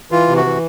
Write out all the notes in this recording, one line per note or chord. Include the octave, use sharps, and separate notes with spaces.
E3 F4
C3
F#4
E3